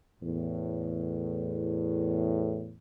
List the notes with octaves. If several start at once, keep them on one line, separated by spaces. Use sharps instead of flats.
E2 A2